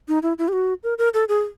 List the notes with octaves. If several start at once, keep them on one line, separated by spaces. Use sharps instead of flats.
D#4
E4
E4
G4
F#4
A#4
A#4
A4
G#4